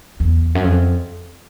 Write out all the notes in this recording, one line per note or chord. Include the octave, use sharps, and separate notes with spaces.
E2
F#2
F2